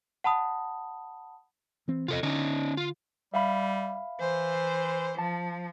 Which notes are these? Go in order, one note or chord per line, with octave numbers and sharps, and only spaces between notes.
F#5 A5 B5 D#6
E3 C4
E2 C3 F4 A4 D#5
D3 C#4 D#4
F4
G3 E5 F5 B5
E3 C5
F3 A5